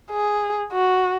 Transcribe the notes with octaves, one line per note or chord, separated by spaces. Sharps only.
G#4
F#4